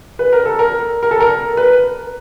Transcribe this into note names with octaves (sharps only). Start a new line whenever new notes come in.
B4
A#4
A4
A#4
A#4
A4
A#4
B4